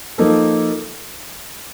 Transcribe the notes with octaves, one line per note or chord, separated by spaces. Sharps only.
F3 A#3 D#4 A4